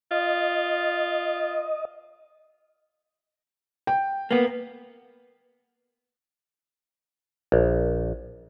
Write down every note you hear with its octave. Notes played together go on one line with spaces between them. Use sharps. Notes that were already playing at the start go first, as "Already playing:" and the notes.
F4 D#5
G5
A#3 B3
A#1